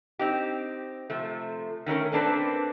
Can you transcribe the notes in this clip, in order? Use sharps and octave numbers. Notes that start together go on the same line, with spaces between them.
C4 D#4 G4
C3 F3 A3
D#3 A3 C#4 A#4
A#3 C4 D4 A4 B4